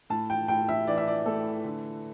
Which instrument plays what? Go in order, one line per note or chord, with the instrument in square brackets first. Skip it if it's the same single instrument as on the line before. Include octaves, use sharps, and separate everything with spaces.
[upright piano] A2 A5
G5
A2 G5
E5
E3 D5
E5
D5
A3 A4
D3